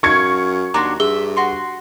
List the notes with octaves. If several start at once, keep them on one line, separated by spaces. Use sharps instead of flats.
F#2 F5 C#6 G#6 C#7
D#2 D4 F#4 A#5 C6
G2 G#4 E5 G7
F#4 C6